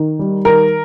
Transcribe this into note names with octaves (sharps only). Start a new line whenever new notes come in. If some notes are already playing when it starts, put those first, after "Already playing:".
Already playing: D#3
G3
D#3 A#4